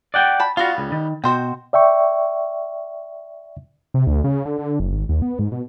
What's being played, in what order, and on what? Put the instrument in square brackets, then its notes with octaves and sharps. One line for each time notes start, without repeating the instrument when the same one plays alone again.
[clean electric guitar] D5 F#5 G5
[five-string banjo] A5 B5
[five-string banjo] G3 B3 F5 [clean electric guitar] F4 F#4
[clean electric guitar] C#2
D#3
[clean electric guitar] B2 [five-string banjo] F#4 C5 G5
[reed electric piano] D5 E5 G5 C#6
[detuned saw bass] C3
D2
C#3
D3
D3
F#1
G#1
D#2
B3
G#2
B2